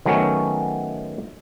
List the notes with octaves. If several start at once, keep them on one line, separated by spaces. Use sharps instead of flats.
D#3 F#3 A3 B3 C#4